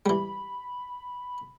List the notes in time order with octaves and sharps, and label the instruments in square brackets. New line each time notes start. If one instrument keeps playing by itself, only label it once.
[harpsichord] E3 G3 [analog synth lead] B5